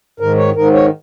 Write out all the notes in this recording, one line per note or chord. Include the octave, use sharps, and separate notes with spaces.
G#2 D#3 A#4
C#5
G#2 D#3 A#4
C#5